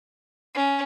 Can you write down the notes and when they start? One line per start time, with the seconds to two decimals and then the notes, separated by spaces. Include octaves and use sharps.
0.55 C#4